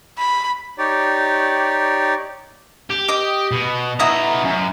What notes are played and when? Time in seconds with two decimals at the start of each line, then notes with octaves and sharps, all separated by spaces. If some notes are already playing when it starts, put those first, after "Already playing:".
0.18 B5
0.78 D#4 G4 C#5 D5
2.90 G4
3.08 D#5 D6
3.52 B2
4.00 B3 E4 F#4 D#5 A#5
4.43 F#2